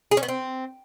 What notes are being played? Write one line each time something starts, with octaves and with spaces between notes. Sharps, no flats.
G#4
C#4
B3
C4